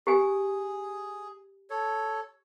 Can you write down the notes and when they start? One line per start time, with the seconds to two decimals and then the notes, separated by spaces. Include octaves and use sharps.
0.07 G4 G#4 G#5
1.70 A4 C#5